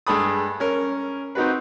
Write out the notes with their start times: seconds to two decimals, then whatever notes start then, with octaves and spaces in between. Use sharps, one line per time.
0.07 G2 G#3 A4 B5 D#6
0.60 C#4 A#4
1.35 C4 D#4 F#4 B4